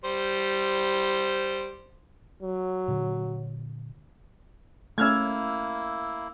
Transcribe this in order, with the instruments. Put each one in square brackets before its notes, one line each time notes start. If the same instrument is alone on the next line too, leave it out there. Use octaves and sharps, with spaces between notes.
[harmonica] G3 C5
[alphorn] F#3
[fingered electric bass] A#2 D3
[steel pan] A3 C#4 [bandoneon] A#3 E4 [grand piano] E6 F6 G#6